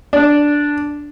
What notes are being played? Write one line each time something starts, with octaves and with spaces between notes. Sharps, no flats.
D4